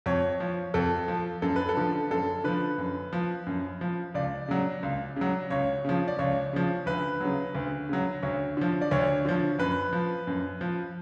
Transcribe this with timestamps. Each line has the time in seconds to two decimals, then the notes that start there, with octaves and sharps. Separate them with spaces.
0.06 F2 C#5
0.40 F3
0.74 F2 A4
1.08 F3
1.42 F#2 A4
1.56 B4
1.69 A4
1.77 D3 F3
2.11 F#2 A4
2.44 D3 F3 B4
2.78 F#2
3.13 F3
3.47 F#2
3.81 F3
4.14 C#2 D5
4.48 C#3 F#3
4.83 C#2
5.16 C#3 F#3
5.50 C#2 C#5
5.85 C#3 F3
6.08 D5
6.19 C#2 C#5
6.53 C#3 F3
6.86 D2 B4
7.21 C#3 F#3
7.55 D2
7.89 C#3 F#3
8.23 D2 C#5
8.57 D3 F3
8.81 D5
8.91 D2 C#5
9.25 D3 F3
9.59 F#2 B4
9.93 F3
10.27 F#2
10.61 F3